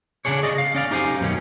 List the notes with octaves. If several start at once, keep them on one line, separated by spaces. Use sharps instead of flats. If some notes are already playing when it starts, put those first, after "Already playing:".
C#3 E3 D4 G#4 C#5
G#4 D5 D#5
F5
C#4 D5 F5
D#4 G4 C5 F5 G#5
F#2 B2 D#3 C#4